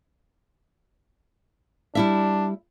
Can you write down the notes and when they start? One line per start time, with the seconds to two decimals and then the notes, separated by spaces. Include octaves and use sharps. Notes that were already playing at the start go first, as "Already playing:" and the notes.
1.95 G3 D4 E4 E5